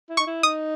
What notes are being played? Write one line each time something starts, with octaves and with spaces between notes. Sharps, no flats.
E4
D#4 C#6
E4
D#4 D#6